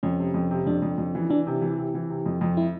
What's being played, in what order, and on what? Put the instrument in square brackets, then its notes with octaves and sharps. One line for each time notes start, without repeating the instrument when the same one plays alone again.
[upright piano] F2 [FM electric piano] C#4
[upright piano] C3
F2
C3
[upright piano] F2 [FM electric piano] D4
[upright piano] F2
F2
E3
[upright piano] E3 [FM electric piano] D4
[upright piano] C3
E3
C3
E3
C3
F2
F2
[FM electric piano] E4